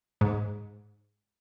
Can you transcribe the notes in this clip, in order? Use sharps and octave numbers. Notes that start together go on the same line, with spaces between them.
G#2